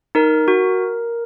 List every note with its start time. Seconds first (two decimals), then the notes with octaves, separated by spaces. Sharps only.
0.15 D#4 A#4
0.48 F#4